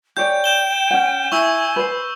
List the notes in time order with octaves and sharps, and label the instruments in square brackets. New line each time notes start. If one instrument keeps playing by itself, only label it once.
[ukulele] G#4 C#5 D5 [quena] G5 [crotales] G6
[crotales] G6 E7 G7
[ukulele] C#4 F#5
[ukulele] E4 [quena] G#5 [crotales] C#6 E6
[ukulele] B4 C5